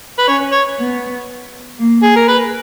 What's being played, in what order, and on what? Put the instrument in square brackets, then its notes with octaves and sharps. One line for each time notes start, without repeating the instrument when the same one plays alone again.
[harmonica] B4
[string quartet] C#4 [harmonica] C#5
[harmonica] C#5
[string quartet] B3
A#3
[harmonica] G#4
A#4
B4